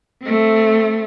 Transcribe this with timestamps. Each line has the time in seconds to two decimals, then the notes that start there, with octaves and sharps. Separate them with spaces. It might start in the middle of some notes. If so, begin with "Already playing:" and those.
0.22 A3 C4